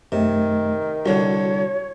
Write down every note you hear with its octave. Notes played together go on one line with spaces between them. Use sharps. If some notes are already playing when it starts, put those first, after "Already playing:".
F#2 C3 D#3 A3
C2 D3 F#4 C#5